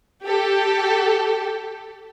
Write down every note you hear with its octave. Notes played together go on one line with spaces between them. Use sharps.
G4 A4